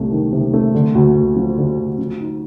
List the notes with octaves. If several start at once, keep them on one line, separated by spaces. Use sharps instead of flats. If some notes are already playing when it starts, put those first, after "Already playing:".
Already playing: C2 C3 A3
D#3
C3
A3
D3
D2
D2
F3
D3
D2
F3
D#4